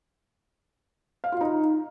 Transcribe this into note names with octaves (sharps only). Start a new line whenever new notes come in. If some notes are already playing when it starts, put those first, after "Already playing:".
F5
F4
D#4